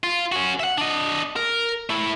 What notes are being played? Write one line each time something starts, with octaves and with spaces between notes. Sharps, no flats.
F4
C#4 F#4
E5 F#5
D4 D#5
A#4
A3 E4